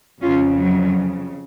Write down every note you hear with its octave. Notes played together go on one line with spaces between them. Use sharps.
F2 C#3 C#4 F4
F#3